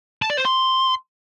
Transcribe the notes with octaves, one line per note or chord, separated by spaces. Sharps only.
A5
D5
C5
C6